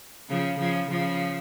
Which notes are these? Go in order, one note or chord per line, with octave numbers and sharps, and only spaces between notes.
C#3 F3
C#3 F3
C#3 F3